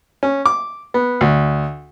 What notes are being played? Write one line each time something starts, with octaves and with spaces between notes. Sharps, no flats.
C#4
D6
B3
D2